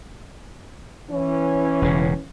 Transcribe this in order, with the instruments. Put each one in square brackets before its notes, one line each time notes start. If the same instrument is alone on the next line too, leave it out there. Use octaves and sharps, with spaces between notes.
[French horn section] E3 C#4
[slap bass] E1 C#3